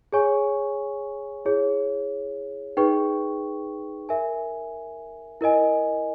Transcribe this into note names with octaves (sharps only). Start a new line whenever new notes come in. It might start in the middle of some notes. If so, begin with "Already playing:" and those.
G#4 C#5 G#5 C#6
E4 G#4 C#5
D#4 G#4 B4 G5 C#6
A#4 E5 G#5
E4 A#4 D#5 G#5